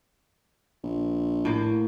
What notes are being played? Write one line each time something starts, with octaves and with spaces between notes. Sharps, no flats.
A#1
A2 A#3